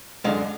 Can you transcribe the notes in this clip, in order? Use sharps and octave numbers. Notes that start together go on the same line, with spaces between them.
F#2 D3 G#3 F5